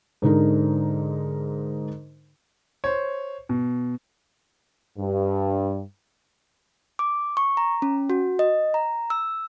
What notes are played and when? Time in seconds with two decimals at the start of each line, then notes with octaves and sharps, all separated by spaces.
0.22 G#2 D3 D#4 A#4
2.84 C5 C#5
3.49 B2
4.98 G2
6.99 D6
7.37 C#6
7.57 A#5
7.82 C#4
8.10 F#4
8.39 D#5
8.74 A#5
9.10 E6